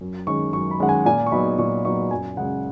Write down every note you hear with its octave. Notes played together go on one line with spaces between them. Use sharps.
F#2
D#3 G#3 C#4 C#6
F#2 C#6
B5
D#3 G#3 C#4 F#5
G#5
A#2 G#5
C#6
F#3 B3 D#4 B5
A#2 C#6
F#3 B3 D#4 C#6
F#2 G#5
C#3 G#3 C#4 F#5